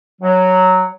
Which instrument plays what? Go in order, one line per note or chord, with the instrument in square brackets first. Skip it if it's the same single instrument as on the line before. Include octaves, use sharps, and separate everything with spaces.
[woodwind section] F#3